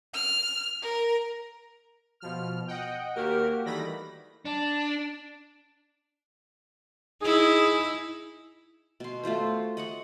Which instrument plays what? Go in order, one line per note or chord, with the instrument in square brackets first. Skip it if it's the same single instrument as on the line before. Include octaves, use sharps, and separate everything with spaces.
[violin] F6
A#4
[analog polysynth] B2 F3 F6
D#5 F#5 G5
[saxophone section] D#2 A#4 [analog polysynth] A#3 F#4 G4
[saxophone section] D#3 G3 A3 [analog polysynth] E3 B5 A#6
[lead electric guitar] D4
[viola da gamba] D#4 E4 [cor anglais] G#4
[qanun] B2 C6
A3 F4 F#4 C5
D#5 F#5 C#6